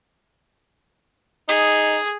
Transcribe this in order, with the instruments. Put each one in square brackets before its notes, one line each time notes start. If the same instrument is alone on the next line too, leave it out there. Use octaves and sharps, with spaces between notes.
[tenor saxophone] D#4 [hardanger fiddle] G#4